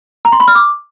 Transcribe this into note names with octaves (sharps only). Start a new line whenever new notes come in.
A#5
C6
B5
F6
D6